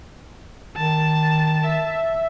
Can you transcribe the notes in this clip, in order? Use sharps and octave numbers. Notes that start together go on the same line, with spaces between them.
D#3 A5
E5